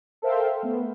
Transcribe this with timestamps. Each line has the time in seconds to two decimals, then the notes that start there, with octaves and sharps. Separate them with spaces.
0.22 A4 A#4 C5 E5 F5 G5
0.63 A3 B3